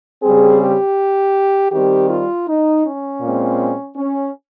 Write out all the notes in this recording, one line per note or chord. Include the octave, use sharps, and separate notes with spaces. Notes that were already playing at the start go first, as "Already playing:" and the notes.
C#3 G3 C4 G#4
G4
D#3 G3 C4 G4
F4
D#4
C#4
A#2 G#3 C4
C#4